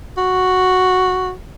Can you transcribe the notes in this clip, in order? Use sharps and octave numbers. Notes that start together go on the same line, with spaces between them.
F#4